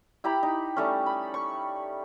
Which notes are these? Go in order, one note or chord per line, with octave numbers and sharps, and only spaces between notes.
E4 G4 A#5 B5
D#4
G3 A3 C#4
B5
C#6